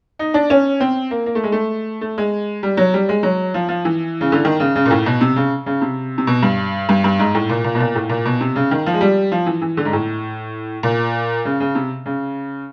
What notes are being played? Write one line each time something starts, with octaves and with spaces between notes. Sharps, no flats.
D#4
D4
C#4
C4
A#3
A#3
A3
G#3
A3
A3
G#3
G3
F#3
G3
G#3
F#3
F3
F3
E3
C#3
D3
D#3
C#3
C#3
A#2
A2
B2
C3
C#3
C#3
C3
C3
B2
G2
G2
G2
G#2
A2
A#2
A#2
B2
A#2
A2
A#2
B2
C3
C#3
D#3
F3
G#3
G3
F3
E3
E3
D3
G#2
A2
A#2
C#3
C#3
C3
C#3